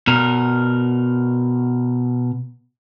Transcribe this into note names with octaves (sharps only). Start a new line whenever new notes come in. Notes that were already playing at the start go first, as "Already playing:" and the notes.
B2 A#4